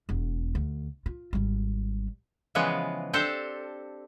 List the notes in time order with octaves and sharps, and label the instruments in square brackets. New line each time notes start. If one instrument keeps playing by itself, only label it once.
[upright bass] E1 E2
D2
F4
G#1 G3
[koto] C#3 E3 F3 G#3 B3
C4 D4 G4 A4 C5